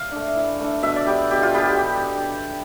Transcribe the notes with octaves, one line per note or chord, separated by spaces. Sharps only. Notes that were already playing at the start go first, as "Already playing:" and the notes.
Already playing: F5
A3 D4
E3
A3 D4
B2 E5
D5
B3 D4 G4
B2 G4
F4
B3 D4 G4